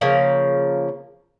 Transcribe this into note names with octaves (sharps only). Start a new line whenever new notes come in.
C#3 F3 A#3